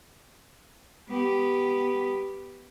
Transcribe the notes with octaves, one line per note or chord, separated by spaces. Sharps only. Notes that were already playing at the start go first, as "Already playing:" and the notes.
B3 G4